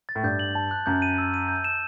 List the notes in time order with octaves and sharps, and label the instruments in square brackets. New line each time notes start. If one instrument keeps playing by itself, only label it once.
[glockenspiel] A6
[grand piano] A2
[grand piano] G2 [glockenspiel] G6
[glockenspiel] F#7
A5
F#6
[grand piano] F#2 [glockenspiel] G6
[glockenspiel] D#7
E6
D#7
G6
E7